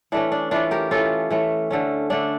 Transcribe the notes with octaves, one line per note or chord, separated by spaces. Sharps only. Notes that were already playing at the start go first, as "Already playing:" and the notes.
E3 A3 C#4 D4
D4
E3 A3 C#4 D4 F4
G4 A#4
E3 A3 C#4 F4 A4
E3 A3 C#4
D3 A3 C#4
D3 A3 C#4 D4